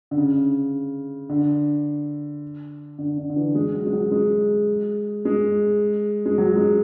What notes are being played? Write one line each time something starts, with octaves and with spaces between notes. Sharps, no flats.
D3
C#3
D3
D3
D3
D3
E3
G#3
F#3
G#3
F#3
G#3
G#3
G#3
F#3
G#3